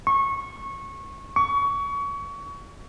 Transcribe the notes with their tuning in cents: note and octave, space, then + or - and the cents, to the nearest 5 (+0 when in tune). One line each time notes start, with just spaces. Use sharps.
C#6 -20
C#6 +25